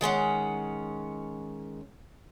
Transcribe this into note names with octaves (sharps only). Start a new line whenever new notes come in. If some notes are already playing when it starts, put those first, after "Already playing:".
D#3 G#3 C#4 F#5